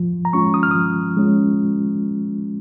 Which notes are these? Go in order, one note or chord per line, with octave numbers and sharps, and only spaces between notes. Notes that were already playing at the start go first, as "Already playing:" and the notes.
Already playing: F3
A#5
G#3 C#4 F4 C#6
D#6
F6
F3 D#6
G#3 C#4 F4